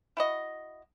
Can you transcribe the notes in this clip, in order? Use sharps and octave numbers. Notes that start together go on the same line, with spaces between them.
E4 F#4 D#5